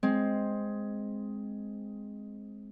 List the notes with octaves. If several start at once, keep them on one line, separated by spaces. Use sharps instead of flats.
G#3 C4